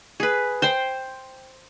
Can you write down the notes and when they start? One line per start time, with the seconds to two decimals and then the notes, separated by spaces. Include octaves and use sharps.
0.20 G#4 B4
0.62 C5 G5 C6